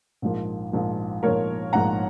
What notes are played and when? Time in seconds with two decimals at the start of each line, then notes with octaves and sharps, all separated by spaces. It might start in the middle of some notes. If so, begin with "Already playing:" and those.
0.22 A#1 G#2 F3 A#3
0.72 A#1 G#2 F3 A#3
1.23 A#1 G#2 F3 A#3 A#4 C#5
1.73 A#1 G#2 F3 A#3 F#5 A#5